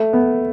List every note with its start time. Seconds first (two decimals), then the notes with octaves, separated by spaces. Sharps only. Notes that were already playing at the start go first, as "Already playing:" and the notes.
Already playing: A3
0.13 B3